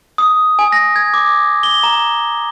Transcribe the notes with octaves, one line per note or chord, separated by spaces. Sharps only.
D#6
G#5
A#6
G#6
D6
G7
A#5